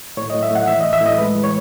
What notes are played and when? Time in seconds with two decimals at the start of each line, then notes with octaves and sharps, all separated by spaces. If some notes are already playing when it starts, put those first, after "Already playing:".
0.17 A2 C#5
0.30 D#5
0.34 A2
0.43 E5
0.51 A2 F#5
0.67 E3 E5
0.81 A2 D#5
0.93 E5
1.01 A2 D#5
1.18 G#3 B4
1.35 E3
1.44 C#5